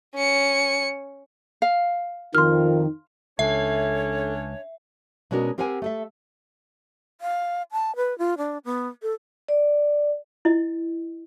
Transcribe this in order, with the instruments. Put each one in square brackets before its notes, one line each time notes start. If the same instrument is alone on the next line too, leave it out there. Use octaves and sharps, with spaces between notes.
[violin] C#4 C#7
[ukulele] F5
[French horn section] F2 F4 A#4 [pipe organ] D#3 [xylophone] C6 F6
[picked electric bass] C#2 [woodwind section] C#4 D4 C#5 [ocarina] A4 [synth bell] E5
[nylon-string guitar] B2 G#3 C#4 D4 F#4 A#4
C4 G4 A#4 C5 F#5 G#5
A3 A4 E5
[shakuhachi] F5
A5
B4
F4
D4
B3
A4
[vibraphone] D5
[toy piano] E4 D#5